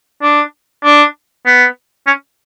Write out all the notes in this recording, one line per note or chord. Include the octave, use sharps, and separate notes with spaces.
D4
D4
B3
C#4